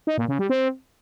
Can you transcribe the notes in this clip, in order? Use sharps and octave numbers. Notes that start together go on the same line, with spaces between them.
D#4
A#2
C#3
G3
C4